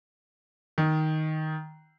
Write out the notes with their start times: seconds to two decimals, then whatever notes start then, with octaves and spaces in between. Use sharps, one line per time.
0.78 D#3